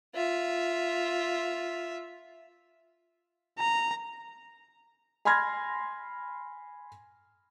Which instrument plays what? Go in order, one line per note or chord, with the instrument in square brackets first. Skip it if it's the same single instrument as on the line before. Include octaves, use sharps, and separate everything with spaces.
[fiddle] F4 E5
[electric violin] A#5
[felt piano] G#5 B5 C6 F6 G#6 A#6